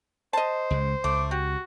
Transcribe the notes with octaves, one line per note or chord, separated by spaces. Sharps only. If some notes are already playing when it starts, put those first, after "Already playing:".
C5 D#5 A5
C#2 C#3 G#3
C#2 A3 D6
F#4 G4